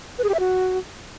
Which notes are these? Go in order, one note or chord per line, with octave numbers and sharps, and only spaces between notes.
B4
G#4
G4
E5
F#4